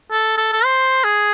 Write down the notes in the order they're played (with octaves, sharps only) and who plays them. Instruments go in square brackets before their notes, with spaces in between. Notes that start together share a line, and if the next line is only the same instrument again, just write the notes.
[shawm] A4
A4
A4
C5
G#4